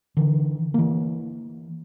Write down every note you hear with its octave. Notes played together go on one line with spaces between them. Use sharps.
D3 E3
E3 A#3